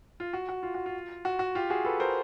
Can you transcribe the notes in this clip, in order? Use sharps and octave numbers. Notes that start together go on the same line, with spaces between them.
F4
F#4
F#4
F4
F#4
F4
F#4
F#4
F4 G4
F#4 G#4
A4 B4
A#4 C5